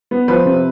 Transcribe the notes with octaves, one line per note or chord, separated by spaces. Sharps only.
B3
F3 B4
C3